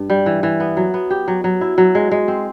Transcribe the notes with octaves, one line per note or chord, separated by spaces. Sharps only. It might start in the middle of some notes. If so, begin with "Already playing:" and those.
Already playing: G2
G3
E3
E3
B3
F#3
B3
G4
F#3
F#3
E4
F#3
G#3
G#3
C4